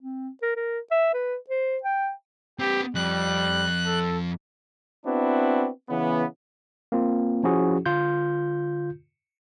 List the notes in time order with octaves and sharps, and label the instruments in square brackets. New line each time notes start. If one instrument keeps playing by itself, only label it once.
[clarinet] C4
A#4
A#4
E5
B4
C5
G5
[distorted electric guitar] C4 B4 [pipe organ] G4
[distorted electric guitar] F2 [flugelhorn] G3 [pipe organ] F#6
[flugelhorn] A4
[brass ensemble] B3 C4 D4 E4 F#4
C#3 E3 B3
[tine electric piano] A#3 C4 F4
F3 C#4 E4 F#4 G#4
D3 F4 G6